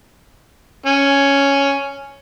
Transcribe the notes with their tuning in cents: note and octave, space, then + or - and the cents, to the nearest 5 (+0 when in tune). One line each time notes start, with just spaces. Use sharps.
C#4 +5